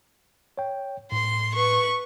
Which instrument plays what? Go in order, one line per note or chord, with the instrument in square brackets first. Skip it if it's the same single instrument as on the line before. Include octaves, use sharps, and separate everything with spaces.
[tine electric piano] C#5 G5
[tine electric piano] A2 [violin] C6
[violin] B4 C#6